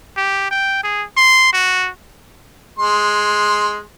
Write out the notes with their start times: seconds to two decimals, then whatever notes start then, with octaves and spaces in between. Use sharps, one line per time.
0.17 G4
0.51 G5
0.84 G#4
1.17 C6
1.53 F#4
2.79 G#3 C6